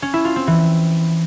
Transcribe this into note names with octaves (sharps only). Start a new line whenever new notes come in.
C#4
E4
F4
C4
E3